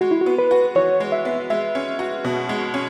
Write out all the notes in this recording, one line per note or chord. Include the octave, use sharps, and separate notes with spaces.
G#3 F#4
E4
F#4
B3
B4
F#4
E3 C#5
G#3
E5
B3
G#3 E5
C#4
F#4
B2
G#3
C#4